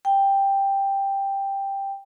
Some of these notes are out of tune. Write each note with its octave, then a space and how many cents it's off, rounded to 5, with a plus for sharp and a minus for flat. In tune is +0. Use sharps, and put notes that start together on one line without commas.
G5 +5